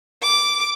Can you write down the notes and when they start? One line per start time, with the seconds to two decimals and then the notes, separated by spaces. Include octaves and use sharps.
0.23 D6